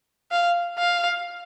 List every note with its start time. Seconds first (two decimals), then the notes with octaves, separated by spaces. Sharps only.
0.32 F5
0.78 F5